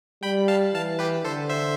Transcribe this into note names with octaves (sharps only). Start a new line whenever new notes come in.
G3 G5 B5
F5 A5
E3 F5 A5
G4 B4
D3 A4 C5
C5 E5